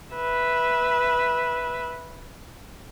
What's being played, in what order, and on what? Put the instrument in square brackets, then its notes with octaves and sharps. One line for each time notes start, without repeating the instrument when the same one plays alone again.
[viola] B4 E5